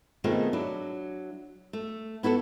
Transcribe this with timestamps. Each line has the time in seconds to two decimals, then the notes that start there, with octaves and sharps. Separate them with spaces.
0.24 B2 D#3 A3 C4 F4 G#4
0.53 F#3 D4 E4
1.73 A3
2.23 B3 E4 F#4 A4